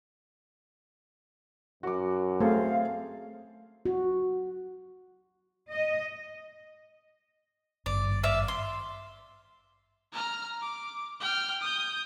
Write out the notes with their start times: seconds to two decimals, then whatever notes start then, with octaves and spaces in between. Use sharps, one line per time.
1.83 F#2 F#4 D6
2.40 A3 C4 G#4 A4 F5
3.86 F#4
5.71 D#5
7.86 G#1 G2 D5
8.23 D5 E5 F5
8.48 C6
10.13 A#5 F6
10.62 D6
11.21 G5 F6
11.62 D#6 G6